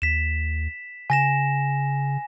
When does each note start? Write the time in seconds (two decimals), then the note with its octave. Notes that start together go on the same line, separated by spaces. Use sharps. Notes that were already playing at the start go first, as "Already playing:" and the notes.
0.02 D#2 B6 E7
1.10 C#3 G#5 A#6 E7